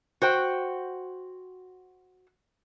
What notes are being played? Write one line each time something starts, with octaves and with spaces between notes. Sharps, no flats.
F#4 C5 G5